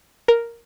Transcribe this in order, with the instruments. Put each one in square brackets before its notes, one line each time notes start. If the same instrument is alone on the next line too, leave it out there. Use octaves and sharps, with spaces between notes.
[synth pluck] A#4